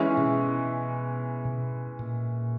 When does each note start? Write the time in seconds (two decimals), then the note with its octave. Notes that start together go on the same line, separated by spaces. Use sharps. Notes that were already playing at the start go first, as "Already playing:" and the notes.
Already playing: E3 G#3 C#4 E4
0.17 B2
1.99 A#2